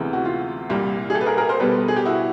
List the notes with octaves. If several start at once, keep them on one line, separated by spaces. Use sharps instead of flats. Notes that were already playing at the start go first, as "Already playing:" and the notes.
Already playing: D2 C3 E3 G#3 B3
F#4
F4
C2 A#2 G3 A#3
G#4
G4 A4
B4
G#4 A#4
G#4 A#4
A#4 C5
B2 G3 B3 A4 B4
G#4
G4
E4 F#4